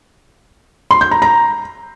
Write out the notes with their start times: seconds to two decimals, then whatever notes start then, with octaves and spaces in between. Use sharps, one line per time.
0.91 C6
1.01 G6
1.11 A#5
1.22 A#5